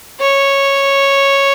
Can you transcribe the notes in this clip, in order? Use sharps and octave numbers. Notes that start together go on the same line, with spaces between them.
C#5